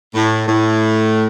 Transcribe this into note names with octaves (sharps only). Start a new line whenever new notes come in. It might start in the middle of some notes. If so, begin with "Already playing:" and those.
A2
A2